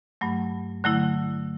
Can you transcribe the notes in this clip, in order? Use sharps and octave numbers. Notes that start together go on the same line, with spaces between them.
G2 F#3 A3
D3 F#3 A3 E4